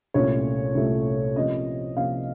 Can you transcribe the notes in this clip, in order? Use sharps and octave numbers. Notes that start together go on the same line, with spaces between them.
C2 A#2 A3 C#4 C#5
C2 A#2 A3 C#4
C3 F3 A#3 C#4 D#5
C3 F3 A#3 C#4 F5